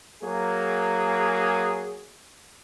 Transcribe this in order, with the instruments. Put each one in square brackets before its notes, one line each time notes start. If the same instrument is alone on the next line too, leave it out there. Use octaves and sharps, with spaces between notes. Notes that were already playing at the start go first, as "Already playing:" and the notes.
[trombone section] F#3 A#3 G#4